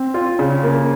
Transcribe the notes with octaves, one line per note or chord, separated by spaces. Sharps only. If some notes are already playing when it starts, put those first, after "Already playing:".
Already playing: C4
F4
C#3
A#3